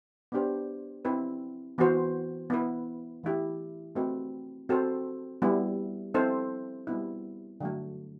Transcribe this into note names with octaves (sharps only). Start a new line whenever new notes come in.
B3 D4 G4 C5
C4 E4 B4
E3 B3 F#4 C5
B3 E4 B4
E3 A3 E4 G4
A3 C4 F#4 B4
C4 F#4 A4 C5
G3 B3 E4
C4 E4 A4 C5
G3 B3 E4
D3 F#3 A3